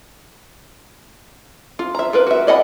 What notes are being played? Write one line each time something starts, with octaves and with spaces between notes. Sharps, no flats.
F4
E5 A#5
F4 A#4 B4
F#4 E5
D5 D#5 F#5 G#5 B5